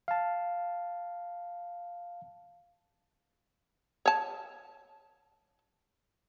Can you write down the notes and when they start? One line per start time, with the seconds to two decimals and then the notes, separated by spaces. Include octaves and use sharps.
0.08 F5 A5
4.06 C#5 A5